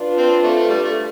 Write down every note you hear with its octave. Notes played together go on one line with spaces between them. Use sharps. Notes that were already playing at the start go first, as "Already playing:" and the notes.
Already playing: D4 F4 B4
C4
A3
A3
G3
A3